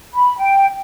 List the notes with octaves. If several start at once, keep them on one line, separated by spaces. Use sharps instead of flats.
B5
G5